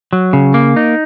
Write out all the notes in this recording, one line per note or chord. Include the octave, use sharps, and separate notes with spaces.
F#3
C#3
A#3
D#4